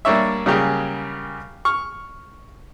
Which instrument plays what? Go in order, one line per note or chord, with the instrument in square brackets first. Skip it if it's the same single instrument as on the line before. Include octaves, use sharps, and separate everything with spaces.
[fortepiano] G3 A#3 D4 C#5 E5
C#3 F#3 G3 A#3 G4 G#4
C#6 F6